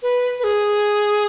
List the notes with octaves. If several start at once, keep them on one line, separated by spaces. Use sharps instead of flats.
B4
B4
G#4